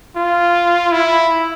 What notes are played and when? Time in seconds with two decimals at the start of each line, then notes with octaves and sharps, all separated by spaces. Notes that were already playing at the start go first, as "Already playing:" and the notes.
0.16 F4
0.92 E4